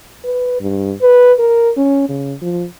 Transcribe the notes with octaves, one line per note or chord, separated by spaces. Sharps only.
B4
G2
B4
A#4
C#4
C#3
F3